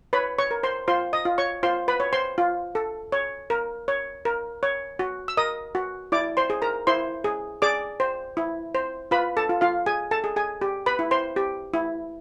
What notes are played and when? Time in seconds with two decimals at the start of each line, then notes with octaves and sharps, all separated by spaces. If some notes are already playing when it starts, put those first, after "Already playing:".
0.13 B4 C#5 B5
0.39 C#5 C#6
0.51 A#4
0.63 C5 C6
0.88 F4 C5 C6
1.13 D#5 D#6
1.25 F4
1.38 C#5 C#6
1.63 F4 C5 C6
1.88 B4 B5
2.00 C#5
2.13 C5 C6
2.38 F4
2.75 A4
3.12 C#5
3.50 A#4
3.88 C#5
4.25 A#4
4.63 C#5
4.99 F#4
5.28 E6
5.37 A#4 D#5 D#6
5.75 F#4
6.12 E4 D5 D6
6.37 C5 C6
6.50 G#4
6.62 A#4 A#5
6.87 E4 C5 C6
7.24 G#4
7.62 G#4 D5 D6
8.00 C5
8.37 E4
8.75 C5
9.11 F4 B4 B5
9.37 A4 A5
9.49 F4
9.61 F4 F5
9.86 G#4 G#5
10.11 A4 A5
10.24 G#4
10.36 G#4 G#5
10.61 G4
10.86 B4 B5
10.99 E4
11.11 C5 C6
11.36 G4
11.74 E4